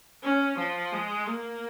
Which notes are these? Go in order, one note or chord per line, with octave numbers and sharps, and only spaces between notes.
C#4
F3
G#3
A#3